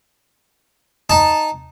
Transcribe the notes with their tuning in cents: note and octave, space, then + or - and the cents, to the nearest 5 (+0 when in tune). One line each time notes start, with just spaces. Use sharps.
D#4 -10 A5 +0